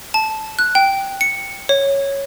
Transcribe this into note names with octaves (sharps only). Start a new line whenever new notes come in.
A5
F#6
G5
C#7
C#5